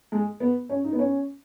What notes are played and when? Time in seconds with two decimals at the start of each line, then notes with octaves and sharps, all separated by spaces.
0.12 G#3
0.40 B3
0.69 C#4
0.84 D#4
0.93 B3
0.99 C#4